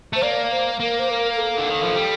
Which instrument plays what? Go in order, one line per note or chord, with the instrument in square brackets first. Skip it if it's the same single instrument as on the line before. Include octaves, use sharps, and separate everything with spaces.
[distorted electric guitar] A3 [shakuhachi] C5
[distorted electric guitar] A#3 [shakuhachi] D5
[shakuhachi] C5
[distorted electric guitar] A#3 [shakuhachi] A#4
[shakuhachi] C5
A#4
A#4
A4
[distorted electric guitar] D3
D#3
F3
G3